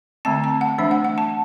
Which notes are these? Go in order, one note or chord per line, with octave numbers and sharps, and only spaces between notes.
D3 A3 C4 A5
A5
F#5
E3 A3 D4 E5
F#5
F#5
A5